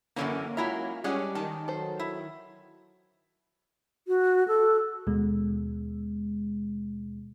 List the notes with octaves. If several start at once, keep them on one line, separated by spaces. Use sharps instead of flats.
F#2 D3 E3 A#3 C#4
F#3 G#3 E4 F4 E5 A#5
G3 G#3 C#4 D4 G#4 F#5
D#3 A5
F#3 A4 C5
E4
F#4
A4
D#2 B2 G#3